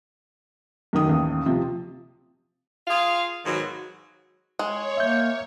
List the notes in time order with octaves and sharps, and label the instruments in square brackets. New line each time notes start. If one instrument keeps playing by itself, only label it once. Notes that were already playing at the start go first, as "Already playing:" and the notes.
[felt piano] F#2 D#3 D#6
A1 D#2
C3 F3
[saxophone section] F4 G#4 F5
G#2 B2 D#3 F#3
[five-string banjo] G#3 [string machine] C#5
[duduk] A#3 [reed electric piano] E5 G6